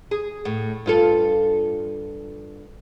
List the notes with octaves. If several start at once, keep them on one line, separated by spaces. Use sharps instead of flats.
G#4
A2
G2 F4 A4